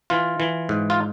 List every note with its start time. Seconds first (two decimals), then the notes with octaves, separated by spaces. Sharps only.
0.10 E3 F4
0.40 E3
0.69 G#2
0.90 F4